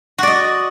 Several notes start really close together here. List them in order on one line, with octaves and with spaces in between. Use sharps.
F#4 D5 D#5